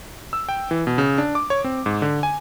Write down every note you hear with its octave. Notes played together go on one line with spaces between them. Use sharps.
E6
G5
E3
B2
C#3
D4
D6
C#5
C4
G#2
D3
G#5